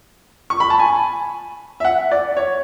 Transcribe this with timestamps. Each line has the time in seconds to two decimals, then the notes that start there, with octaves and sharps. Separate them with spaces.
0.50 C#6
0.60 B5
0.70 A5
0.79 G#5
1.80 E5
1.85 F#5
2.12 D5
2.37 C#5